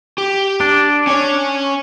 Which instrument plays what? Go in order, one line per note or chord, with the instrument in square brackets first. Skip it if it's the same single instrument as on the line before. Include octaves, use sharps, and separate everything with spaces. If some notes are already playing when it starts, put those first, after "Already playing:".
[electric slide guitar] G4
[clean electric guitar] D4
[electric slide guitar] C#4 C#5